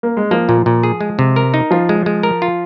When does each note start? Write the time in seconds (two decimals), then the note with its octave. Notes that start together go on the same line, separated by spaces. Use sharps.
0.03 A#3
0.17 G#3
0.31 F3 A#3
0.49 A#2
0.66 A#2
0.83 G#4
1.01 G#3
1.19 C3
1.36 A#4
1.54 D#4
1.71 F3 F4
1.89 G#3
2.06 G#3
2.23 A#4
2.42 F4